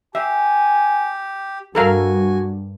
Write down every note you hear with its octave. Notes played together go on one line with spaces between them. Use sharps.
G4 E5 G#5
G2 F#4 A4 A#4 F5 G#5